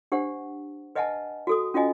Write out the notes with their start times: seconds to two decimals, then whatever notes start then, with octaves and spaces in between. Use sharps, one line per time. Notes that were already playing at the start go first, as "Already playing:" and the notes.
0.12 D4 G4 C5 F#5
0.95 B4 D#5 E5 F#5 G#5 A5
1.47 F#4 A4 D#6
1.74 C#4 F4 F#4 D#5 G#5